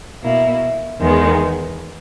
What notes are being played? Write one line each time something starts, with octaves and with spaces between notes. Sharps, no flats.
B2 A#3 E4
E2 D#3 G#3 B3